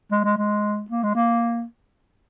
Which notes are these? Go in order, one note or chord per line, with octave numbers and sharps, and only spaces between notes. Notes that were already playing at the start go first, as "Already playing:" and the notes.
G#3
G#3
G#3
A#3
G#3
A#3